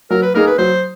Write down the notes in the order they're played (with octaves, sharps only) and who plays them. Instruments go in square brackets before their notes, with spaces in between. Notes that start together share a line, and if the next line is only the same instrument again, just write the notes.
[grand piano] F#3 [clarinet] A#4
[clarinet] B4
[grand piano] A#3 D#4 G#4 [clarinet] A#4
[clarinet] B4
[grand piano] F#3 [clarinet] C5